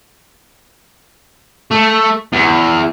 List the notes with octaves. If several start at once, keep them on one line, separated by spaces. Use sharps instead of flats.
A3
E2